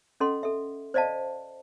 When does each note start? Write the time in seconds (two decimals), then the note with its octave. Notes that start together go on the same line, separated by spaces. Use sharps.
0.20 C#4 A4 D#5 F#5 C6
0.43 A4 E5
0.94 C5 D5 D#5 F5 A5